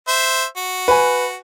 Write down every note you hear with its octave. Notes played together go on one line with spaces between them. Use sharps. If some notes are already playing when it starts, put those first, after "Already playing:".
C5 E5
F#4
B4 G#5